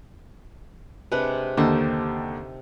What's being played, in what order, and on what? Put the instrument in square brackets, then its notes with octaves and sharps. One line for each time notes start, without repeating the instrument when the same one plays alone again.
[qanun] C3 G#3 D4 [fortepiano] B4
[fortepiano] D#2 D3 [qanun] D#4 G4 A5